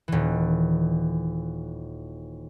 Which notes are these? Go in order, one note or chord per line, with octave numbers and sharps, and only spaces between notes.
D#1 E3